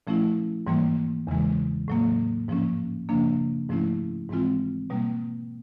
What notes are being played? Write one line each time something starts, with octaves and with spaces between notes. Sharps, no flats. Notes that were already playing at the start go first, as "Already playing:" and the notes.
A#2 F3 A3 C#4 E4
G#2 E3 G3 A#3
E2 C#3 E3 G#3
A2 F#3 A#3
G#2 F3 A#3 C#4
F#2 C#3 F3 A#3 D4
G#2 F3 A3 C#4 E4
G#2 E3 G#3 C4 F4
B2 G3 A#3